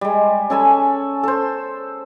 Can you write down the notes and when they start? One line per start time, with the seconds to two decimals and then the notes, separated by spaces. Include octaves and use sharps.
0.01 G3 G#3
0.50 C#4 A4 G#5 B5
1.23 A4 C5